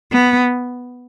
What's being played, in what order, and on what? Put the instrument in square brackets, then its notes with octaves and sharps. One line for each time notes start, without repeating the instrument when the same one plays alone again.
[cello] B3